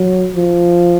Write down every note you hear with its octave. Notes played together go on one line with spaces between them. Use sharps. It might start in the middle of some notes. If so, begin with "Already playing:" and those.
Already playing: F#3
F3